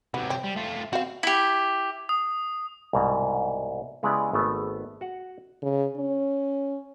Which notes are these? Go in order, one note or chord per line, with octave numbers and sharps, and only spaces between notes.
C3 F#3 B3
C4
G3
A3 F4
C4 F#4 C5 F5
E4 G4
D#6
C2 G#2 B2
C#3 G#3 B3 E4 G4 D5
G#1 A3 B3
F#4 F#5
C#3
C#4